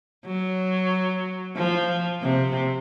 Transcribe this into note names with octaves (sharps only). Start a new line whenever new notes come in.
F#3
F3
C3